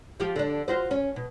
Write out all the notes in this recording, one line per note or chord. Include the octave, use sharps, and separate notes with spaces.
F3 F4 G4
D3 D4
F4 F#4 C5
C#4
B2